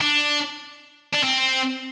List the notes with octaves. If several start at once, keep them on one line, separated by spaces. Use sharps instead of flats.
D4
D4
C4